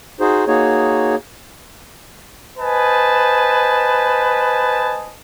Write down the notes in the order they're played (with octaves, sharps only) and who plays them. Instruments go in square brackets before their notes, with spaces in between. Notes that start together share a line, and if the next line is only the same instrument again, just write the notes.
[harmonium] D#4 F#4 G#4 C5
A#3 D#4 F#4 G#4 C#5
[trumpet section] B4 C5 D#5 G#5 A5